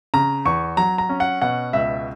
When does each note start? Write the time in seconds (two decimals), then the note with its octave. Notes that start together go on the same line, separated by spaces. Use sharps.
0.14 C#3 A#5
0.45 E2 C#6
0.77 F#3 A#5
0.98 A#5
1.09 C#4
1.20 F#5
1.42 B2 F#5
1.73 C#2 E5